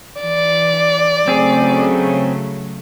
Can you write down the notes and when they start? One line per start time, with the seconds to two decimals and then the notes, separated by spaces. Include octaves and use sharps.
0.21 E3 D5
1.28 C#3 F#3 A3 C4 G#4